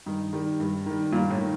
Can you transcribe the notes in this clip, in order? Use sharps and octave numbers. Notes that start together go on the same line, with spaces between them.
G2 D#3
D#3 G3
G2
D#3 G3
G2 A#2
A2
D#3